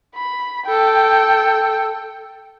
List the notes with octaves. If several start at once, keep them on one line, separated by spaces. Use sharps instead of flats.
B5
A4 G5